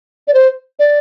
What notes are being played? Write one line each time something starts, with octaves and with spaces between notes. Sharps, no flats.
D5
C5
D5